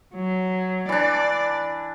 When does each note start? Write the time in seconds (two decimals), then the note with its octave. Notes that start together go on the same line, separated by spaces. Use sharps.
0.15 F#3
0.89 E3 D4 D5